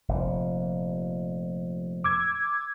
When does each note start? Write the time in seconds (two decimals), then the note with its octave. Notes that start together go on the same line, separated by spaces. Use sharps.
0.08 F1 A#2
2.04 D6 E6 G#6